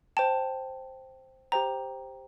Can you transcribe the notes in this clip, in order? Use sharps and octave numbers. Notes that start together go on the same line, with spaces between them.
C5 G5 A5
G4 C5 G5 A#5